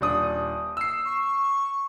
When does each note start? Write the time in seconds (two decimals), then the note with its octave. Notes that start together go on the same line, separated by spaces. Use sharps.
0.01 D#1 D4 D#6
0.77 E6 C7
1.05 C#6